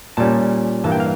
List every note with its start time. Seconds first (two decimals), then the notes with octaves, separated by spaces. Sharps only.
0.17 A#2 G3 C#4 A5
0.84 G2 E3 A#3 A5
0.92 G5
1.00 F5